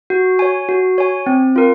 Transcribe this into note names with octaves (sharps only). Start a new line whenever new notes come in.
F#4
C#5 G#5
F#4
C#5 G#5
C4
F4 A#4